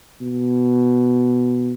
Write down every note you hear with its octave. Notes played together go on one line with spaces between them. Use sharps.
B2